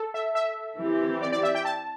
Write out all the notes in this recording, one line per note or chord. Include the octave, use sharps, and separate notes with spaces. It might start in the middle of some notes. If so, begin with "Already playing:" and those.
Already playing: A4
E5
E5
E3 C4 G4
D5
D5
E5
G5
A5